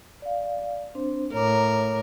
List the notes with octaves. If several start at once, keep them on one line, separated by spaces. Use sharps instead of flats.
D5 F5
C4 D4 C5
A2 A#4 C#5 A#5 D6